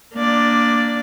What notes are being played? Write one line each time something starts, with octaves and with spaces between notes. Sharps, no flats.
A#3 D4 D5